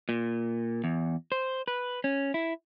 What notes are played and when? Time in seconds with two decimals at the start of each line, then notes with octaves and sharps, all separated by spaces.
0.09 A#2
0.84 E2
1.32 C5
1.68 B4
2.04 C#4
2.34 E4